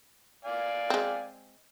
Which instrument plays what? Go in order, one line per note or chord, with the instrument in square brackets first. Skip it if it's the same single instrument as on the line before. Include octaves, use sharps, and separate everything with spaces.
[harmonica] D5 F5 G#5
[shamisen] G#3 C4